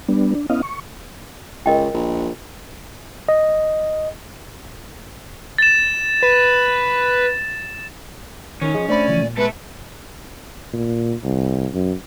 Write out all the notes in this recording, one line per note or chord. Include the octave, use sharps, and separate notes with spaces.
G3 B3 D4
D4
B3 C#4 E4 D#5 F5
C#6
C#2 A#4 D#5 G5
A#1
D#5
A6 E7
B4
D#3 C#4 D#4 A#4 C#5
F3 G#4 D#5
A3 D4 C5 D5 B5
C#3 E3 F3
A#2
C3 G#3 B3 A4 B4 E5
A#2
C2
F#2